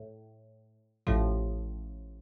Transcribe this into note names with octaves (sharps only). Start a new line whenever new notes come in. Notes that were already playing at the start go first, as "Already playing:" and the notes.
Already playing: A2
A1 A2 F3